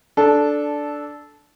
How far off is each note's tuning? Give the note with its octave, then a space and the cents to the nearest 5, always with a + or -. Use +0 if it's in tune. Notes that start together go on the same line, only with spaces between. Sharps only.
D4 +0 A4 -10